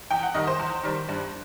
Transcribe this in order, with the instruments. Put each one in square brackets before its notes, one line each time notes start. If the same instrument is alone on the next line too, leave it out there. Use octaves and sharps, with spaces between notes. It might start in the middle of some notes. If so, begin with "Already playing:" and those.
[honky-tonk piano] E2 G5
F#5
D#3 G3 D#5
C5
E2
D#3 G3
G2